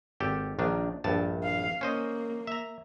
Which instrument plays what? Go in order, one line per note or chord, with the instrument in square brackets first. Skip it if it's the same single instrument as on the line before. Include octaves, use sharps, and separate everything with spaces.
[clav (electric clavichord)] G#1 G4 A4
A#1 D#3 D4
A#1 G2 A5
[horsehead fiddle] F5
[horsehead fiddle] A#3 [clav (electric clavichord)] C#4 C5 D#5
[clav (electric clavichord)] E5 A#5